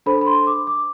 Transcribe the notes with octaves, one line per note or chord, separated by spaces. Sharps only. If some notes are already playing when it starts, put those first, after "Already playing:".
D4 A4 C5 B5
B5
C6
D6
D6